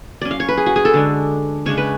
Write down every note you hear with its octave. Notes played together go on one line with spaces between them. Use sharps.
F#3 C#4 D5
F5
C#5
B4
G#4
F#4
G#4
A4
D3 G#3 D4
C#3 G#3 D4 C#5
B4